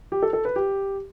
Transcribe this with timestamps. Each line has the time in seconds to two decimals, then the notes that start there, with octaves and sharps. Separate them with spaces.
0.12 G4
0.23 A4
0.33 A4
0.45 B4
0.56 G4